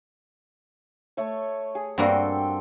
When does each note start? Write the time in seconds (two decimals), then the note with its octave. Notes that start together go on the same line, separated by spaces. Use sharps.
1.17 A3 C#5
1.75 G#4
1.98 G2 A#3 C4 F#4 A4 G5